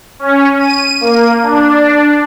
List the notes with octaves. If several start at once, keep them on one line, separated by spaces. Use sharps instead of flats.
C#4
D#7
A#3
D4